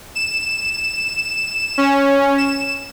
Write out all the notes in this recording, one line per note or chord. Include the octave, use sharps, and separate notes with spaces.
E7
C#4
E7